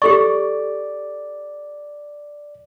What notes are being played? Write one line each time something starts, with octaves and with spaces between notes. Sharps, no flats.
G4 A4 D5 C#6